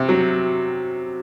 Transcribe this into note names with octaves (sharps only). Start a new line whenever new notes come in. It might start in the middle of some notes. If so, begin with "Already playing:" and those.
Already playing: C3
F#3